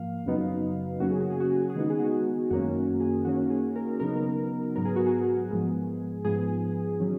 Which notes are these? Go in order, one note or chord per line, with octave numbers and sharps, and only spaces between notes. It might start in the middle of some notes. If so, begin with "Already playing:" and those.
Already playing: G#2 F3 A#3 F5
F#2 C#3 F#3 B3 D#4
C#3 F#3 A#3 C#4 F#4
G#4
F#4
G#4
F#4
G#4
F#4
G#4
D#3 G#3 B3 D#4 F#4
G#4
F#4
F#2 D#3 A#3 C#4 F#4
G#4
D#3 A#3 C#4 F#4
G#4
A#4
C#3 F#3 B3 D#4 A#4
G#2 F#3 B3 A#4
G#4
F#4
G#4
G#2 F3 G#3 B3
G#2 F3 B3 G#4
D#3 F#3 C#4